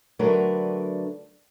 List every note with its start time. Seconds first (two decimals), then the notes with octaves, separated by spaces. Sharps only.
0.19 D3 F#3 A3 D4 A#4 B4